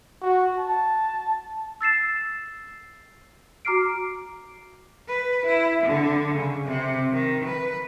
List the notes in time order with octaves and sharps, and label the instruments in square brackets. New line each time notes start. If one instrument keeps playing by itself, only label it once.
[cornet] F#4
A5
[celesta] E6 A6 C7 E7
F#4 A#5 D6 F6 C7 D7
[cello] B4
E4
D3
C#3
C3
D#3
B4